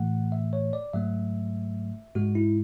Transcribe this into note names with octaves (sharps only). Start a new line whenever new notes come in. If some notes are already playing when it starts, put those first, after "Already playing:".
Already playing: A2 E3 A3 F#5
E5
C#5
D5
G#2 F#3 A3 E5
G#2 G#3 F#4
E4